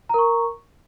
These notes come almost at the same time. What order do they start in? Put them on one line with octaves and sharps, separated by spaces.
A#5 A#4 C#6